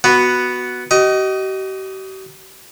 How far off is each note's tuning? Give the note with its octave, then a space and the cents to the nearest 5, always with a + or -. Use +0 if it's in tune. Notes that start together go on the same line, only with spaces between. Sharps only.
B3 +0 F#4 +0
G4 -45 D#5 +5